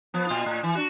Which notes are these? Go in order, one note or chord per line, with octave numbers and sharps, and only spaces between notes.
F3 B3
A#2 F4
A2
E3
D4 F#4